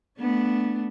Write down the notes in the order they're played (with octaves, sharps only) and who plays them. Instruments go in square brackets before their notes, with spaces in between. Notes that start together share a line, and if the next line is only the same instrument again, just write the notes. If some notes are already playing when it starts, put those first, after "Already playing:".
[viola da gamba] A3 B3 D4